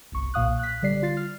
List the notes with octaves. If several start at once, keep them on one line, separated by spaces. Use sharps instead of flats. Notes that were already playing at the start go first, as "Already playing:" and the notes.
G1 C2 C#6
B1 A#2 F5 D#6 F#6
F#6 B6
D3 G3 D5 C7
F4 A6 C7
F6